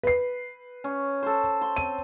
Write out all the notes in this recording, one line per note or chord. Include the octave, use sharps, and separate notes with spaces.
B4 C7
C#4
A4 C5
C6
C4 D#7